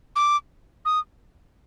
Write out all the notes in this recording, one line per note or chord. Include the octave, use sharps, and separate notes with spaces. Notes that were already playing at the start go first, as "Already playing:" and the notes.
D6
D#6